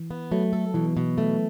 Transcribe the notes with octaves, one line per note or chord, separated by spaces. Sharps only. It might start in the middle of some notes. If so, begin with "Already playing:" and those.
Already playing: E3
B3
F#3 A3
A4
B2 E3
B2
A3